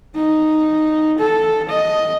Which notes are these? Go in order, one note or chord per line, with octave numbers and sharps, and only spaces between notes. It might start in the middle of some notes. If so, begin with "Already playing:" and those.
D#4
A4
D#5